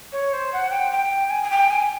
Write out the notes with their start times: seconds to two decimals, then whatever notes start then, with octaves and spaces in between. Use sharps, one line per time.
0.12 C#5
0.33 C5
0.52 F#5
0.71 G5
0.91 G5
1.30 G#5
1.43 G#5
1.50 G5
1.70 G#5